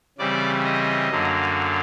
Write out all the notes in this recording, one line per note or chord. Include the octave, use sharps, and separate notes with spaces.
C#3 E3 G3 C4 D5
D#5
F#2 D3 F#3 A#3